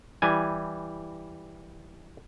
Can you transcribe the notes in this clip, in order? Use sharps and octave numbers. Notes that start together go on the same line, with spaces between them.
E3 G3 G#5